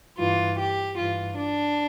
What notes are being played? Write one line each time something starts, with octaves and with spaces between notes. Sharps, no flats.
G2 E3 F4
G4
G2 E3 F4
D4